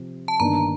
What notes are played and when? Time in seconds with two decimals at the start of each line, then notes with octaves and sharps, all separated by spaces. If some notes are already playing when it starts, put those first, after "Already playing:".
Already playing: C3 F3 C4
0.28 A5
0.40 G1 G2 D#3 A#3 D4 A#5